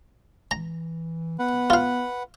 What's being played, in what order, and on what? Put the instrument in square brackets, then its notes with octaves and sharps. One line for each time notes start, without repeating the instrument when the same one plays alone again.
[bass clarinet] E3 [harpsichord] A#5
[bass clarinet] B3 [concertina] B4 F#5
[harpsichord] F4 F5